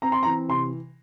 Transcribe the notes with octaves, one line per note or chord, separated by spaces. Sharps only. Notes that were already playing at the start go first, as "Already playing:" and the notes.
C4 A#5
C6
A#5
E3
C3 C6